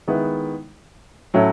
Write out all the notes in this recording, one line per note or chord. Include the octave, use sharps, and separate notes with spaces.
D#3 G#3 B3 E4
A2 F#3 C#4 E4 A4